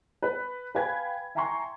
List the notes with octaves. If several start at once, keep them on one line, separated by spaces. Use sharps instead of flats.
B4
B4 F5 G5 G#5 B5 G#6
E5 G5 G#5 A#5 C6 C#6